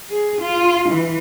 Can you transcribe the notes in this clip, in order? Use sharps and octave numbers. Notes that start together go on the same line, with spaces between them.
G#4
F4
E3